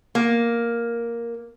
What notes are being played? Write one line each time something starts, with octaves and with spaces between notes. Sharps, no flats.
A#3